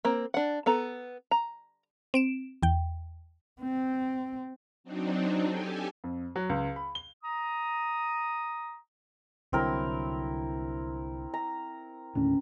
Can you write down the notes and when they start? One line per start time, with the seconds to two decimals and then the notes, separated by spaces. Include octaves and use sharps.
0.05 A#3 C4
0.34 D4 F#5
0.66 B3 A4 A#5
1.31 A#5
2.14 C4 D7 E7
2.63 E2 G5
3.61 C4
4.84 F#3 C4 D4 D#4
5.49 G4 A4 G#5
6.04 F2
6.36 F#3
6.49 C#2
6.76 B5
6.95 G7
7.24 A#5 D#6
9.53 C2 D3 F#3 C4 E4 A#4
11.34 A#5
12.15 D#2 A2 D3 C#4